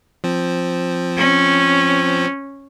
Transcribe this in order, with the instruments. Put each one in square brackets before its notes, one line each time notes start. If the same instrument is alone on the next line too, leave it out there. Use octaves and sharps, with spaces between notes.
[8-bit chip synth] F3 C4
[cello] C#4